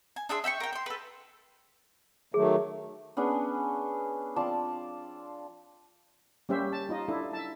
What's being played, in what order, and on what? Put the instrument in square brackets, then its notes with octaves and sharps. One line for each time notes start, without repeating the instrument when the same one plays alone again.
[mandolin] G#5
D4 G#4 E5 C6
E5 G5 B5 C#6
A#4 G5
G5 C6
A4 B4
[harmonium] D#3 F#3 A3 [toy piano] G#4
[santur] B3 C#4 D4 G#4
F3 C4 D5 A5
[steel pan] G3 A#3 C#4 G4 C5 E5
A5
D#4 F4 D#5
D4 E4 A4
E5 A5